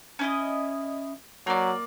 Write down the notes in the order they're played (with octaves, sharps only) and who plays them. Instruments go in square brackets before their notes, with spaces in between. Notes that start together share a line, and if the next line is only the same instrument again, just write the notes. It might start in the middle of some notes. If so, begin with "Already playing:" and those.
[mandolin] C#4 E4 D#5
[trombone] F#3 [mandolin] A#3 D5